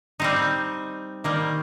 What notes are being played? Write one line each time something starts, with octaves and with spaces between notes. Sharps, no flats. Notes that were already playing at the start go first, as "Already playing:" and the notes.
G3 C4 D#4
D#3 G3 A#3